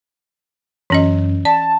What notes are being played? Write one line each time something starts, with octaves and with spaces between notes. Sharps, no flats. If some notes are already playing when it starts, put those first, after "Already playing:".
F#2 E3 C#4 D#5
D5 A5